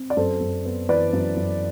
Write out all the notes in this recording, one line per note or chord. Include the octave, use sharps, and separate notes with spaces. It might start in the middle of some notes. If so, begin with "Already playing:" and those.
Already playing: C4
D5
F#2 A4 C5
F#2
B3
E3 B4 D5
F#2
F#2